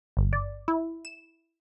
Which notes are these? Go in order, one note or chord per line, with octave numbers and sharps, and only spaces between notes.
G1
D5
E4
E7